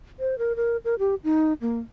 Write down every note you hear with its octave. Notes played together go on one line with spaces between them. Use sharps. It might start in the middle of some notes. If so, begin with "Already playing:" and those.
C5
A#4
A#4
A#4
G4
D#4
A#3